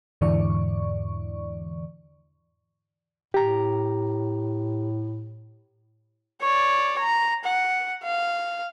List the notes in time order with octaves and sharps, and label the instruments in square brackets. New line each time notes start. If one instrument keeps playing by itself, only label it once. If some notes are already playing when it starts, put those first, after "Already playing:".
[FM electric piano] E2 G#2 D3 E3 D5 C#6
[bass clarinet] A2 [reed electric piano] G4 A#5
[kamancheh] C#5 D5
A#5
F#5
F5